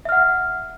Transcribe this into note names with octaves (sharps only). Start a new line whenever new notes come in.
E5 F#5 F6